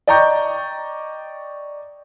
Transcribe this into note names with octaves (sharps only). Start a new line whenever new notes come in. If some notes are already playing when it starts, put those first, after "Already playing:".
D5 D#5 G5 A#5 C#6 G6